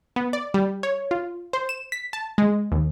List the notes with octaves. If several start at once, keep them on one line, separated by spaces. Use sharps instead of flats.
B3
D5
G3
C#5
F4
C5
E7
B6
A5
G#3
D#2